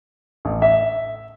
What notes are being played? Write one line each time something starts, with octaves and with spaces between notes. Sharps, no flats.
A1
E5